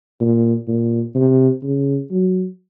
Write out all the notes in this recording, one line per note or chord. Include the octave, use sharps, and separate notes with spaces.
A#2
A#2
C3
C#3
F#3